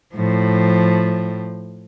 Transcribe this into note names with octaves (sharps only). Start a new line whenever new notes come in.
A2 F3